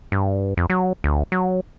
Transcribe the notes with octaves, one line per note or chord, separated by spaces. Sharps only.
G2
F2
F#3
D2
F#3